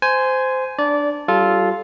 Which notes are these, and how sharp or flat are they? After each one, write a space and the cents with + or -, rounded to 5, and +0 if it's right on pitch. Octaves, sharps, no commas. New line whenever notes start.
C5 -15 G#5 +5
D4 +5 D5 -20
G3 -30 F4 +0 A4 -20